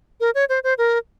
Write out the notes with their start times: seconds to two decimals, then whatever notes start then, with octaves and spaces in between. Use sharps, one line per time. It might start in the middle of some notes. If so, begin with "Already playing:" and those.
0.20 A#4
0.35 C#5
0.49 C5
0.64 C5
0.78 A#4